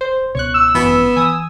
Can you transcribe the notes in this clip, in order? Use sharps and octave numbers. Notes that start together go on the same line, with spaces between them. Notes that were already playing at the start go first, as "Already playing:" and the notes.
C5
C#2 B2 C#5 C#6 F#6
E6
G#1 F#2 E3 B3
E3 G#5 D#6